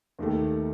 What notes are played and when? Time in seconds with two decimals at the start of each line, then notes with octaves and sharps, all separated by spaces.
0.19 D#2 D#3 A3